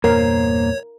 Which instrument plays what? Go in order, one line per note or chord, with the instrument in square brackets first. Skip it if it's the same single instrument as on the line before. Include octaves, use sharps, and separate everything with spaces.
[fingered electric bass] E2 G2 A#2 [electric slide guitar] A#3 C5 [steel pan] A#4 [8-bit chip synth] C#5